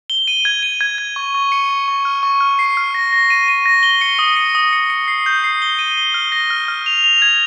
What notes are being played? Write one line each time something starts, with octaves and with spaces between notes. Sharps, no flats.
G7
D#7
G#6
D#7
G#6
G#6
C#6
C#6
C#7
C#6
C#6
F6
C#6
F6
C7
F6
A#6
A#6
D#7
D#7
A#6
G7
C#7
D#6
C#7
D#6
C#7
C#7
C7
G6
C7
G7
D#7
G7
F6
A#6
F6
F6
F7
F7
G#6